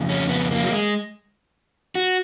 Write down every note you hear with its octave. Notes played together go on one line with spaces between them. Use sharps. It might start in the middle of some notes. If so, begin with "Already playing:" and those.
Already playing: F2 C#3
C#4
B3
A#3
F#3
G#3
F#4